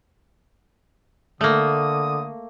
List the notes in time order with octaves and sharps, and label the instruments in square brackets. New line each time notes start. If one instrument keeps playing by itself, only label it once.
[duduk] D3 [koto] A3 A#3 [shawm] D#6